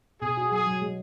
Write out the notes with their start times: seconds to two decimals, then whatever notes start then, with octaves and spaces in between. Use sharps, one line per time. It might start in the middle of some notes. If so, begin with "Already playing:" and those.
0.22 B2 G#4
0.37 F#4
0.52 F#3 G#4
0.67 F#3
0.82 G#3